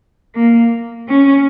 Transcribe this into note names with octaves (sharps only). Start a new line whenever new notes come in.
A#3
C#4